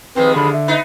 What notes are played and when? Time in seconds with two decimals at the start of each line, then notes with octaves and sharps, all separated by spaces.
0.16 D#2 F3 G#3 C4 B4
0.36 D3 B5
0.53 E5
0.68 B3 D#4